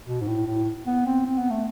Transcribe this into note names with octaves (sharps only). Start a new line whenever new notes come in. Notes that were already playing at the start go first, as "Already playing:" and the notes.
B2
G#2
A2
A2
B3
C4
C4
B3
A3